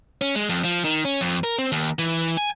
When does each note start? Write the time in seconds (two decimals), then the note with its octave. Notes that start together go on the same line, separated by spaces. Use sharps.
0.21 C#4
0.36 G#3
0.49 F2
0.64 F3
0.84 D#3
1.05 C#4
1.21 F2
1.44 A#4
1.58 C4
1.72 D#2
1.99 E3
2.37 G#5